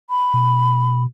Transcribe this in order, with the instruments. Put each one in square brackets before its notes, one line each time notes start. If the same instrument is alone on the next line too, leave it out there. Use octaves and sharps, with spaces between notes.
[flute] B5
[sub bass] B2